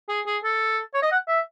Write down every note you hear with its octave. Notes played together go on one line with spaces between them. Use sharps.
G#4
G#4
A4
C#5
D#5
F#5
E5